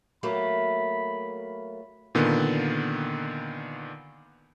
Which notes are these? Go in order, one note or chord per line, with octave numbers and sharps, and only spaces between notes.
F#3 A3 A#3 B5
A#2 D3 D#3 B3